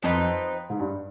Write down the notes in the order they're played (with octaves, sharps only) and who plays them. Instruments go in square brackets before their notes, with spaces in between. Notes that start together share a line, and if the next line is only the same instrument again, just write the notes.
[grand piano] F2 [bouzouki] F3 C4 D#4 B4
[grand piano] G#2
G2